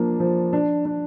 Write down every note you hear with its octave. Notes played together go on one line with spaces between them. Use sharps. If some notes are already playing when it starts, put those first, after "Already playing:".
Already playing: F3 A#3 D4
F3
D4
D4